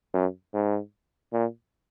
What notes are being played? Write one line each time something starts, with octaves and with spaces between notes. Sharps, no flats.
F#2
G#2
A#2